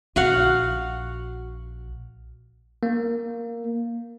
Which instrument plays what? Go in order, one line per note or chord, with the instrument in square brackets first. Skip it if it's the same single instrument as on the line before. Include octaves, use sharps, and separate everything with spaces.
[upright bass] A#1 [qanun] F#4 F5 F#5
[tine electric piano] A#3